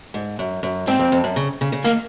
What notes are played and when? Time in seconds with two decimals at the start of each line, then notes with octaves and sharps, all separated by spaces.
0.14 G#2
0.39 F#2
0.63 F#2
0.87 G#2 C4
0.99 F2
1.12 F2
1.24 F#2
1.36 C#3
1.61 C#3
1.72 C#3
1.85 D#3 A#3